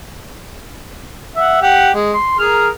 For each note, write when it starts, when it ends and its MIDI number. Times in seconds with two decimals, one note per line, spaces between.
1.36 1.58 76
1.36 1.58 78
1.62 1.90 67
1.62 1.90 78
1.94 2.12 56
2.13 2.36 84
2.39 2.69 68
2.39 2.69 70
2.39 2.69 89